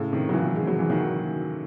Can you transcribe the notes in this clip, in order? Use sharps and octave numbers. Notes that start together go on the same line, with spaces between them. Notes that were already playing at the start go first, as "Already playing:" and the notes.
Already playing: A2 C#3
C3 D#3
F#3
C#3 E3
G#3
F#3
E3
D#3 F#3